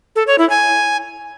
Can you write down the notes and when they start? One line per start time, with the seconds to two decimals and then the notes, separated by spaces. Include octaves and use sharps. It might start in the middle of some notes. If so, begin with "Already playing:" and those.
0.16 A4
0.27 C#5
0.38 E4
0.50 G#5